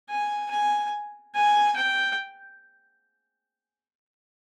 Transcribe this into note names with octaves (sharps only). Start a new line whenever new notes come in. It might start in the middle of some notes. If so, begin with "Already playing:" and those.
G#5
G#5
G#5
G5